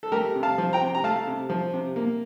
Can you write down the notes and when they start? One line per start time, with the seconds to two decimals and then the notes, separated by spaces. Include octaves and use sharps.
0.03 A4
0.12 A3 G4 A#4
0.36 C3
0.43 F5 A5
0.58 F3
0.73 G5 A#5
0.81 C3
0.95 A#5
1.04 A3 F5 A5
1.27 C3
1.50 F3
1.73 C3
1.96 A#3